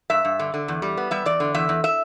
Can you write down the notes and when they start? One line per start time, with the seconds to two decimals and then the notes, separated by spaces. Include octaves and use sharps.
0.10 G2 E5
0.25 G2
0.39 D3
0.54 D3
0.68 E2
0.82 G3
0.97 B3
1.11 G3 E5
1.26 E2 D5
1.40 D3
1.54 E2 E5
1.69 E2
1.84 E5